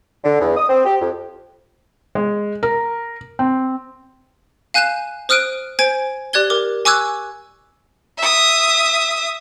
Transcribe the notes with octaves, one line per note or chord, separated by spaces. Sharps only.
D3
E2
D#6
C4
G4
F2
G#3
A#4
C4
F5 G#5 F#6 G6 D#7 E7
C5 D#6 F6 F#6 D7 D#7
C5 G#5 G#6 D7
G4 D5 F#6 G#6 G7
A#4 D6
G#5 C#6 D6 E6 F#6 G#6
E5 D#6